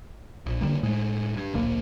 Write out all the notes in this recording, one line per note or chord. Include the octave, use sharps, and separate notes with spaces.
A#1
D3 E3 G3 A#3
A2 G#3
G2
D1 A#1 A#3